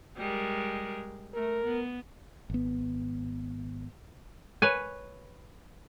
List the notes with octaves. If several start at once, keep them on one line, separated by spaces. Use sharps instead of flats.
G3 G#3 A#4
A3 A#4
B3
G#1 B3
B4 C#5 G#5